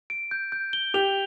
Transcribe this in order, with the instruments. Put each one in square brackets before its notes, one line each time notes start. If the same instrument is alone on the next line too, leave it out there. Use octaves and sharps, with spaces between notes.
[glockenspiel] D7
G6
G6
G7
[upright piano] G4 [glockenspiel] F7